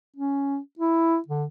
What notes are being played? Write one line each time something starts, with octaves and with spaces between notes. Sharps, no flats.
C#4
E4
D3